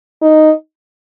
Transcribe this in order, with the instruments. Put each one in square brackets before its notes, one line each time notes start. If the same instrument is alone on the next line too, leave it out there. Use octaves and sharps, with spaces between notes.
[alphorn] D#4